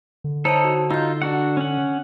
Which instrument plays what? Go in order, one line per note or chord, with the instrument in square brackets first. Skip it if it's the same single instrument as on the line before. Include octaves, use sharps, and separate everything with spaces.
[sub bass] D3
[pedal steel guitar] D#4 A4 [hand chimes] C5 C#5 A5
[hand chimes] F#4
[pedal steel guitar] D#4 F4 [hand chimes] E6 G6
[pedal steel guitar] D4 F#4 F#5
C#4 F#5